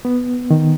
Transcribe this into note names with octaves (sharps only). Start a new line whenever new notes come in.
B3
D#3